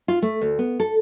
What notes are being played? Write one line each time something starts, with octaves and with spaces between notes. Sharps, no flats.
F4
A3
D2
B3
A4